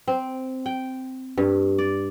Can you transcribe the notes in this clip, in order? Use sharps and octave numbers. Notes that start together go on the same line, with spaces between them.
C4
G5
G2
D5